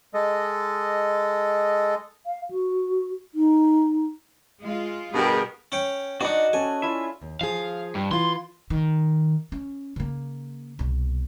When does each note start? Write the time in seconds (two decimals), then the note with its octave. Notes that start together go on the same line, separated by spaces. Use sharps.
0.14 G#3 A4 D#5
2.26 F5
2.51 F#4
3.35 D#4
4.60 G#3 F4
5.14 G2 B2 G4 G#4 A#4
5.72 C#4 C#5 G5
6.21 D4 D#4 F#4 D#5 F#5 D6 D#6
6.53 C#4 A4 G#5
6.82 E4 F4 E5
7.22 D#2
7.41 F3 G#4 F5
7.95 G2
8.11 E3 F4 C6
8.70 D#3
9.52 C#4
9.96 C#3 A#3
10.79 C2 B2